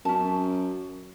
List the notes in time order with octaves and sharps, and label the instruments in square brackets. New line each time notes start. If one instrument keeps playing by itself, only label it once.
[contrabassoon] F#2 [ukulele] C#4 A5